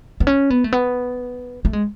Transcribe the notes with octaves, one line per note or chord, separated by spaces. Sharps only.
B3
C#4
B3
A3
B3
A3
G#3